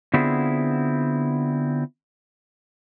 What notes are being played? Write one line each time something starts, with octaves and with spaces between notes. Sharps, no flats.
D3 B3 C4 E4 F4 G#4